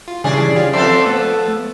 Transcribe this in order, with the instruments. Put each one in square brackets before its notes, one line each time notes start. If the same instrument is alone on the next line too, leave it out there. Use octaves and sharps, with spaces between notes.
[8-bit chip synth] F4
[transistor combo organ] C#3 E3 [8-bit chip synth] G3 D4 [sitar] G#4 D5
[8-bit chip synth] C#4 G4 [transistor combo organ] F4
[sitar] F3 A4 B4 [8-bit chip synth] C4 E5 [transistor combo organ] C5 D5 C6
[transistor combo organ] A3 [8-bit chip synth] B3